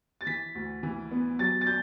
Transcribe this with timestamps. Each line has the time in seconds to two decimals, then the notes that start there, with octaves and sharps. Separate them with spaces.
0.21 A6
0.26 E3 B6
0.55 D2
0.83 E3
1.11 B3
1.39 F#3 A6
1.61 A6
1.67 G6